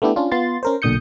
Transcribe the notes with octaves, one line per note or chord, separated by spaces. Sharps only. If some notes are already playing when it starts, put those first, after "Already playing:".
A3 B3 D4 E4 G4
C#4 D4 F4
B3 F4 C6 A6
C#4 A#4 C5
B1 A#2 D3 D#6 G6 C#7